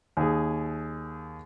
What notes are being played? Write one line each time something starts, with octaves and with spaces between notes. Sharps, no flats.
D#2 G#4